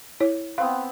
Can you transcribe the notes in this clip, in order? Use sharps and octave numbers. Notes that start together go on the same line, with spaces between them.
E4 C#5
B3 C4 B4 F5